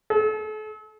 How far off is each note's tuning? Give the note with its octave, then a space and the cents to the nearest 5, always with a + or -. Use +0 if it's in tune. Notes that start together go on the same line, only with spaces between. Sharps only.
A4 -40